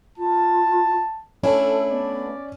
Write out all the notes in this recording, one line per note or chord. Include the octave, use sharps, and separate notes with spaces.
F4 A5
A3 C#4 D4 E4 A4
B3 D5